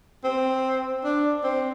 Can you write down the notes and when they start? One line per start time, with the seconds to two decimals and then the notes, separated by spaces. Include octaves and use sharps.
0.24 C4
1.04 D4
1.43 C4